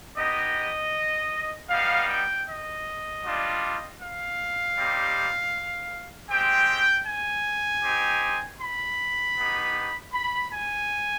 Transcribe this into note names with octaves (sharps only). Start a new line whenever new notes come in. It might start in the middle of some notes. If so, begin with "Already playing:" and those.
B3 D#4 G4 D#5
G3 B3 D#4 F5
G5
D#5
G3 D4 F4
F5
G3 C4 D#4 G4
G#3 C4 G4 G5
G#5
C4 D#4 G4
B5
B3 D#4 G4
B5
G#5